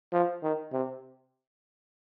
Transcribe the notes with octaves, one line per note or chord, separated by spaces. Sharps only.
F3
D#3
C3